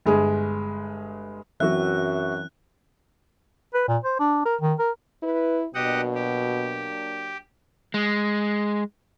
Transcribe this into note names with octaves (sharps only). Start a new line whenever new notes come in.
G1 G#3 G#4
F#2 E3 F#3 C4 F#4 E5 F#6
B4
A#2
C5
D4
A#4
D#3
A#4
E4 B4
B2 F#3 A#3 D4 G4 D#5 F#5
G4
G#3